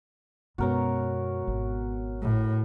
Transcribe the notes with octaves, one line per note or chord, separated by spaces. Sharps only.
F#2 B2 G#3 B3 F#4 A#4 C#5
G#1
A2